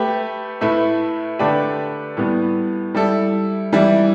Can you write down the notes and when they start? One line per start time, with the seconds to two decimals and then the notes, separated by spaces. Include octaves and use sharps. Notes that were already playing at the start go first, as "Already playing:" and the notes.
Already playing: A3 G4 B4
0.61 A2 A3 E4 B4
1.39 D3 A3 D4 G4 B4
2.17 A2 G3 B3
2.95 G3 E4 A4
3.72 E3 G3 E4